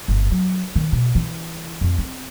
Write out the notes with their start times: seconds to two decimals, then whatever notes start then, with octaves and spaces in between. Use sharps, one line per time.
0.08 G1
0.31 F#3
0.76 D#3
0.92 B2
1.15 E3
1.81 F2
1.98 C4